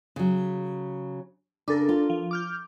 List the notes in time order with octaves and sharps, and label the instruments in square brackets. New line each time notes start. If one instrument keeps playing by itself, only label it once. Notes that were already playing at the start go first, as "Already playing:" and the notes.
[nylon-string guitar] C#3 F#3
[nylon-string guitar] C#3 [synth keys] D4 A4 A#4
[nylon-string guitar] F4
[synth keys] F3
D6 F6 G6